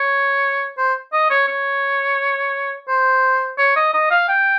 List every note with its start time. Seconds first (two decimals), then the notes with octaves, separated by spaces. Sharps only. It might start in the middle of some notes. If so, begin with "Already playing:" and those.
Already playing: C#5
0.78 C5
1.13 D#5
1.30 C#5
1.48 C#5
2.88 C5
3.58 C#5
3.76 D#5
3.94 D#5
4.11 F5
4.28 G5